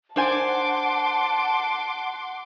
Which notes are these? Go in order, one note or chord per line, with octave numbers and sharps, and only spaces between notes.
D4 C5 F#5 G#5 A5 C6 D6